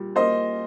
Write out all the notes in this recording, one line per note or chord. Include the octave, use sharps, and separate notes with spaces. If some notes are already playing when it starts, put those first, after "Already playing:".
Already playing: A#2 G3
A#3 C5 D#5